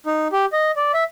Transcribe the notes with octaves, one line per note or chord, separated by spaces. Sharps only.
D#4
G4
D#5
D5
E5